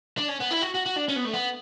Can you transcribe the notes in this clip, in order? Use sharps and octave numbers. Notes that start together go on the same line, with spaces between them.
D4
C#4
B3
E4
F#4
F#4
F#4
D4
C#4
B3
A3
B3